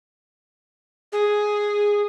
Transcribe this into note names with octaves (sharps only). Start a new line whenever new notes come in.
G#4